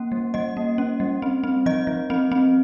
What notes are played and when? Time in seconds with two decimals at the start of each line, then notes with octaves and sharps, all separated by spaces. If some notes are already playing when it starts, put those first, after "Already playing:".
Already playing: A#3 C#4
0.12 G3
0.34 G3 D#5
0.57 A#3
0.78 C#4
1.00 G3
1.22 C4
1.44 C4
1.66 F3 D#5
1.87 F3
2.10 C4
2.32 C4